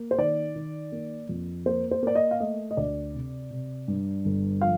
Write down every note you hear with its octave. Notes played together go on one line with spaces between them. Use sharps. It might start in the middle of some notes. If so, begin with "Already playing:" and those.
Already playing: A#3
C5
D#3 D5
D#3
A#3
F2
A#3 C5
C5
A#3 D5
D#5
F5
A3 D#5
D#5
D2 D5
C3
C3
G2
G1
F3 F5